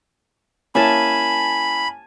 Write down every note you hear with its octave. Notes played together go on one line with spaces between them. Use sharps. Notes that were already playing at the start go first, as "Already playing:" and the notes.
A#3 C#4 E4 G#5 A5 B5